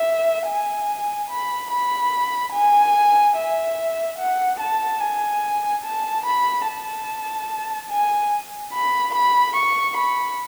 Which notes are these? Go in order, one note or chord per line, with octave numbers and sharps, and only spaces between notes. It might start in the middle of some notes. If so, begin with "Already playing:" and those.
Already playing: E5
G#5
B5
B5
G#5
E5
F#5
A5
G#5
A5
B5
A5
G#5
B5
B5
C#6
B5